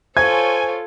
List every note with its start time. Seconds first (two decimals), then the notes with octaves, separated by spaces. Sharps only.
0.17 F4 A4 C5 C#5 G#5 G#6